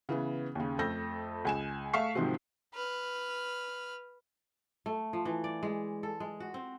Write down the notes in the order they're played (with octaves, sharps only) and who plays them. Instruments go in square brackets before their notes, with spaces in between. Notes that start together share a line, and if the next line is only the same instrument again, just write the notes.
[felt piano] C#3 E3 B3
D#2 C#3
F2 A3 A4 G6 A#6
C#2 G#5 E7
A3 E5 F5 C#6 C7
G#2 C3 D#3 F3 C4 F#4
[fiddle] B4 F6
[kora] A3
F3
E3
D5
G#3
A4
G#3
F#4
C4